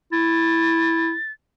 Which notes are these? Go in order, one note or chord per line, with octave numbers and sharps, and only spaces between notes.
E4 A6